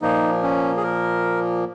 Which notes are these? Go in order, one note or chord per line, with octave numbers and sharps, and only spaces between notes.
A#2 F3 A#3 D#4
C#4
G#4
A#4